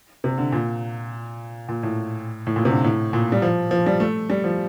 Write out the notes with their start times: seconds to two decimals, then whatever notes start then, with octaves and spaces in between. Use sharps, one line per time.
0.24 C3
0.38 D3
0.52 A#2
1.68 A#2
1.83 A2
2.47 A2
2.56 A#2
2.65 C3
2.70 D3
2.84 A2
3.13 A#2
3.32 G3
3.42 F3
3.71 F3
3.86 G3
4.00 A3
4.30 G3
4.44 F3